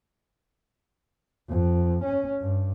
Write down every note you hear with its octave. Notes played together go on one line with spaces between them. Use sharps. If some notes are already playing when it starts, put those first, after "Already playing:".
F2
C#4
G2